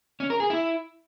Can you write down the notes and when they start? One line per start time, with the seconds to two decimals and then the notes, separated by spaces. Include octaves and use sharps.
0.20 C#4
0.30 A#4
0.40 G#4
0.50 E4